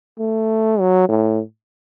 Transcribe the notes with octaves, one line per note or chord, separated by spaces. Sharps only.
A3
F#3
A2